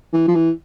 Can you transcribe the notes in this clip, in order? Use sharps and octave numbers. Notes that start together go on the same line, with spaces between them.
E3
F3
E3